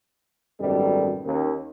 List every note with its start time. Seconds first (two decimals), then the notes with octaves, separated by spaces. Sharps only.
0.60 G#1 F#2 B2 G3 A4
1.25 D#2 D#3 A#3 C#4